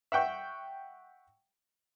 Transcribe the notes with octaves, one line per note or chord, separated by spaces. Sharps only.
E5 F#5 G5 C#6